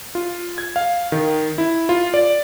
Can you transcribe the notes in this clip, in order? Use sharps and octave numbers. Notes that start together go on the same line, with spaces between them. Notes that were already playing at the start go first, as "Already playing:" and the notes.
F4
G#6
F5
D#3
E4
F4
D5